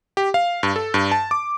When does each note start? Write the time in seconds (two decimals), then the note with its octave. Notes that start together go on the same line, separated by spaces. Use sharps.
0.17 G4
0.34 F5
0.63 G2
0.76 A4
0.94 G2
1.12 A5
1.31 D6